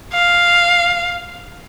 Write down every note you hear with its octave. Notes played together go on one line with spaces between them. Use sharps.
F5